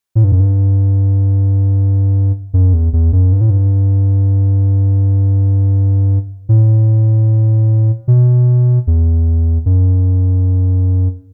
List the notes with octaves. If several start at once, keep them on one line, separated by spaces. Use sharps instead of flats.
A2
G2
F#2
G2
F#2
E2
E2
F#2
G2
A2
G2
A2
B2
E2
F#2